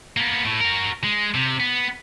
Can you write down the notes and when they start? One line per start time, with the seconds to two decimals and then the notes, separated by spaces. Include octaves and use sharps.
0.17 A#3 B3
0.45 A2
0.61 F#4 A#4
1.04 G#3
1.34 C3
1.60 B3